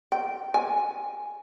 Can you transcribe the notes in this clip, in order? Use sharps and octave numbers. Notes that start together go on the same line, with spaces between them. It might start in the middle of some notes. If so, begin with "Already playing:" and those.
G5
G#5